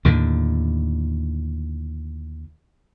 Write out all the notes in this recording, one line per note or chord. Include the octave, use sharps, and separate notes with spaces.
D#2 A2 D3